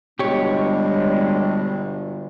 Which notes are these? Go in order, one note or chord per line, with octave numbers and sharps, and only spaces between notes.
G1 B2 G3 G#3 D4 G4 C#5